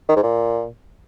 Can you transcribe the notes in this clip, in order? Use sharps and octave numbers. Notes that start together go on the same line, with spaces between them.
D#3
G#2
A#2